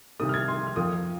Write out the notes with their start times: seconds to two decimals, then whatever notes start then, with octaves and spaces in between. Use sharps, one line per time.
0.20 C2 C3 D#3 A#3 D#6
0.29 F6
0.34 G#6
0.48 C6
0.67 F6
0.76 F2 F3 A#3 D#6